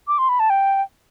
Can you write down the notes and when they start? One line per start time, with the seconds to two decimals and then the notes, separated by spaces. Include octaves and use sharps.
0.08 D6
0.18 C6
0.29 B5
0.40 A5
0.50 G5